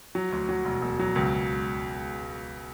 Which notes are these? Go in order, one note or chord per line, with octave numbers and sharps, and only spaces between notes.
F#3
D2
F#3
E1
E1
F#3
C#2